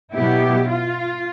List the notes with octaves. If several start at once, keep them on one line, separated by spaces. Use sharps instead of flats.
B2 F#3 B3 E4 G4
F4